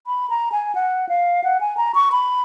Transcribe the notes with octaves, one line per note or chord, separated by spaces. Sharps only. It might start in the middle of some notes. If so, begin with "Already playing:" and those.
B5
A#5
G#5
F#5
F5
F#5
G#5
A#5
C#6
B5